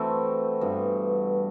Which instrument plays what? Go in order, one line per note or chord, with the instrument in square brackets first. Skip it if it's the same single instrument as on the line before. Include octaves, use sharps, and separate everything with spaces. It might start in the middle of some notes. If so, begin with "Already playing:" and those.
Already playing: [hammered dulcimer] E3 A3 C4 F#4
G2 E3 B3 F#4